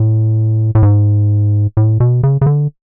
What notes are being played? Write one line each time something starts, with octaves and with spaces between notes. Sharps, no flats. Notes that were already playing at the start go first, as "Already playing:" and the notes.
Already playing: A2
A2
G#2
A2
B2
C#3
C#3
D3